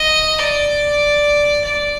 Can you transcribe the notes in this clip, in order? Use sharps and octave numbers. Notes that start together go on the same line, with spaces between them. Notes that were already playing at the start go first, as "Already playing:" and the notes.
Already playing: D#5
D5
D5